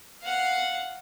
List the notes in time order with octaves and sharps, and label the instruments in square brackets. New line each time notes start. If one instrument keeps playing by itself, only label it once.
[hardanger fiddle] F5 F#5